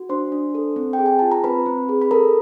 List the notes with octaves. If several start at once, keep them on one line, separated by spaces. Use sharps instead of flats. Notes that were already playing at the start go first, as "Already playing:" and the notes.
Already playing: F#4
D4 C5 C6
D4
A4
C4
G5
G#4
G#5
F4 A5
A#5
C4 B4 B5
C4
G#4
B5
A4 A#4 A#5